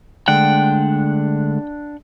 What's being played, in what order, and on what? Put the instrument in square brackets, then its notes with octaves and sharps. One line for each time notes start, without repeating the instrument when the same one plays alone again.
[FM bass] D3 [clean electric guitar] G#3 A3 [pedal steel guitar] D4 F#5 [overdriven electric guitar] G5